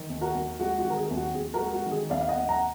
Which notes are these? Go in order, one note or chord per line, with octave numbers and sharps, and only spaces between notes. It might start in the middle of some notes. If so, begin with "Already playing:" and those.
Already playing: D#3
D#2
F#4 A#4
D#2
G#3 F#4
F#4
D#3
A#4
G#4
D#2
F#4
D#2 G#4
F#4 A#4
G#3
F#4
D#3
G#4
D#2 D5 F5
F5
D#5 F#5
D#2
F#5 A#5